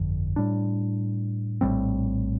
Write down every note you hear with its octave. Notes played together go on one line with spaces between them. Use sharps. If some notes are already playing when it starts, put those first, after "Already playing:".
Already playing: G1 F2 D3 F3
A2 G3 D4
A#1 A2 G3 C4